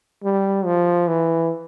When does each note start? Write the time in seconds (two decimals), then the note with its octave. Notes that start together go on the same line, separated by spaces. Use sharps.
0.24 G3
0.65 F3
1.08 E3